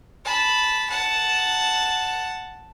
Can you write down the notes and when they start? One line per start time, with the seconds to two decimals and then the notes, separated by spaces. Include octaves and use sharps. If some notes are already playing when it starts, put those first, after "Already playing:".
0.24 A5 B5
0.90 F#5 A5